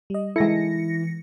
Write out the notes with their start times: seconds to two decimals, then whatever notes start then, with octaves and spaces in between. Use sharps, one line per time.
0.10 G3 D#5
0.36 E3 G#3 E4 A4 A#6 C#7